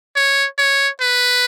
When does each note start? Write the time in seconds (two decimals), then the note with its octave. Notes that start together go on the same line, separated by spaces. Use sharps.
0.16 C#5
0.58 C#5
1.01 B4